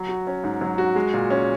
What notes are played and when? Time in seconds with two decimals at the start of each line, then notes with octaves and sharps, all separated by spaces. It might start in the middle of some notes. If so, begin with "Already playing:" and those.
Already playing: F#3
0.09 F#4
0.27 C#4
0.44 G#2
0.61 F#3
0.78 F#4
0.96 G#3
1.13 A#2
1.30 C#4